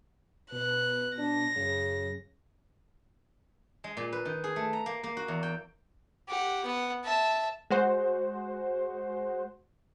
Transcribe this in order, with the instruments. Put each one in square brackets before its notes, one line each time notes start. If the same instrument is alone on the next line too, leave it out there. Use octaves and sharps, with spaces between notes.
[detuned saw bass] B2 [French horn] B4 [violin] F#6
[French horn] D4 [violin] A#6
[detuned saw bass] F#2 [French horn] C#3
[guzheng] G#3
A#2
B4
D#3
G#4
A3
A#5
A#3
A#3
F#4
E2
G5
[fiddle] G4 F#5
B3 F#5
E5 A5
[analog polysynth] G#3 F#4 C5